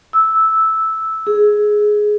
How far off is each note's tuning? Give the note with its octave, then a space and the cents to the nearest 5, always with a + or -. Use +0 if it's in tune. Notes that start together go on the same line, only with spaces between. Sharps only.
E6 -10
G#4 +10